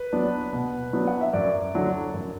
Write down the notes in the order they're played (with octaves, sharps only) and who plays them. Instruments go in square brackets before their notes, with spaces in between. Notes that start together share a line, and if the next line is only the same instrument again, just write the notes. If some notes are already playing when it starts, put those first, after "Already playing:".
Already playing: [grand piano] B4
F#3 B3 D4
B2
F#3 B3 D4
F#5
E5
F#2 D5
D3 F#3 D4
F#2